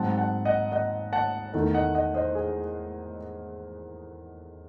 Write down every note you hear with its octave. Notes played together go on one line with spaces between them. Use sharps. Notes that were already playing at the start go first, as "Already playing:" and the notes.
Already playing: G#2 F#3 C4 F#5 A5
F#5 A5
D#5 F#5
D#5 F#5
F#5 A5
E2 D#3 A3
D#5 F#5
D#5 F#5
C5 D#5
G#4